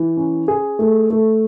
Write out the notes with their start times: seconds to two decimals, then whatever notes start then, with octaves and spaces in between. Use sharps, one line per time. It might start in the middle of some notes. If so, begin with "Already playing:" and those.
Already playing: E3
0.17 C#4
0.48 G#4
0.79 A3
1.10 A3